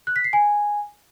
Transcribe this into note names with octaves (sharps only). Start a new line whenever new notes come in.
F#6
B6
C7
G#5